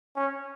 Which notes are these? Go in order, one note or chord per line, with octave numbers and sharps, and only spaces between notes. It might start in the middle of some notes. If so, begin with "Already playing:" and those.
C#4